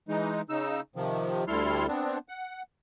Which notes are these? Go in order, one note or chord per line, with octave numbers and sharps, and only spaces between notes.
E3 G#3 D#4
C#3 D#4 E6
C3 D#3 F3
D2 G3 E4 A4 C6 F6
B3 C4 D4
F#5